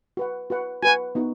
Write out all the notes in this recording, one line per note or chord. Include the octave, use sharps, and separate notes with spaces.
F#4 B4 F#5
F#4 B4 F#5
F#4 B4 F#5 G#5
B3 D#4 F#4